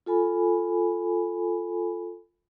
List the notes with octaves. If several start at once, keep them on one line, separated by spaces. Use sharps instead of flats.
F4 A4 G#5 B5